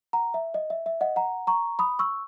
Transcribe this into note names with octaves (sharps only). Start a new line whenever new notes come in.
F#5 A#5
E5
D#5
E5
E5
D#5 F#5
F#5 A#5
A#5 C#6
B5 D#6
C#6 E6